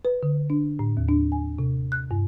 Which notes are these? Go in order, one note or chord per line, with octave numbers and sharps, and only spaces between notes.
B4
D3
D4
A2
D#2
D4
G#5
C3
F#6
G2